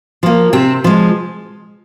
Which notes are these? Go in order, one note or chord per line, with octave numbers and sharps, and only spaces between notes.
F3 A#3
C3 C4
F3 G#3